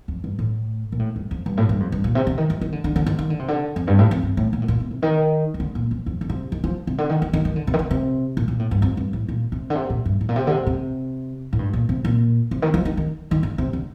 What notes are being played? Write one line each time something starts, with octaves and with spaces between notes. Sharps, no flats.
F2
G2
A2
A#2
A2
G2
F2
G2
A2
G2
F2
G2
A#2
C3
D3
D#3
F3
D#3
D3
D3
D3
D#3
D#3
D3
C3
D3
F2
G2
A2
F2
G2
A2
A#2
A2
A#2
C3
C3
D#3
D#3
D3
A#2
F2
F2
F2
C3
D#3
F3
C3
D3
D#3
D#3
D#3
D#3
D3
C3
D#3
D3
C3
A#2
A#2
A2
G2
F2
G2
A2
A#2
C3
D3
C3
A#2
G2
A2
A#2
C3
D3
C3
C3
A2
G2
A#2
C3
A#2
C3
D#3
F3
D#3
D#3
D#3
D3
C3
D3